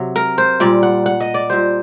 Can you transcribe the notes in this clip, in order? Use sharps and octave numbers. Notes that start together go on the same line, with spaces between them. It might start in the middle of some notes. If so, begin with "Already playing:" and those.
Already playing: C3 F#3
A#4
C5
A#2 G3 D5
F#5
F#5
D#5
D5
A#2 G3 C5